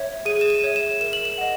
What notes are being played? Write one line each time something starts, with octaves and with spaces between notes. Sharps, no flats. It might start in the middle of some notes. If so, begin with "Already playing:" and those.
Already playing: C#5 E5
G#4 D#7
E7
D#7
C#5 E5
E7
A#4 E7
F#7
E7
D#5 F#5